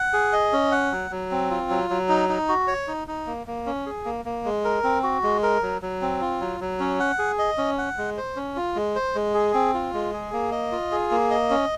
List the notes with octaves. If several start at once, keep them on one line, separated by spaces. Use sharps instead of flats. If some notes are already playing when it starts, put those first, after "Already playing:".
Already playing: F#5
G#4
D#5
C#4
F#5
F#3
F#3
C4
F4
F#3
F#3
D#4
D#4
F#4
C#5
D#4
D#4
A#3
A#3
C#4
G#4
A#3
A#3
G#3
A#4
C4
F#4
G#3
A#4
F#3
F#3
C4
F4
F#3
F#3
C#4
F#5
G#4
D#5
C#4
F#5
G#3
C5
C#4
F4
G#3
C5
G#3
G#4
C4
F4
G#3
G#4
A#3
D#5
F4
G#4
A#3
D#5
C#4